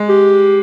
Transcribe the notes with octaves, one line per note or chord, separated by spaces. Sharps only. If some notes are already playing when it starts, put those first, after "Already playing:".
Already playing: G#3
G4